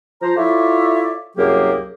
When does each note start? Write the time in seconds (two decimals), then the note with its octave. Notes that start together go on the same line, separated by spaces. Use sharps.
0.22 F3 C5 A#5
0.37 E4 F4 A4 C#5 D5 E5
1.38 C2 F#2 F#3 A#3 G4 G#4